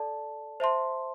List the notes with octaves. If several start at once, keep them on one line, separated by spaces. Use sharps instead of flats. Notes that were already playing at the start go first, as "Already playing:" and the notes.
Already playing: A4 D5 A5
C5 E5 A5 C6